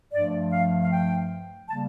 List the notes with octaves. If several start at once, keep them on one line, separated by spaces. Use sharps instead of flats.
G2 F3 A3 D5
F5
F5
G5
C#3 G3 A#3 A5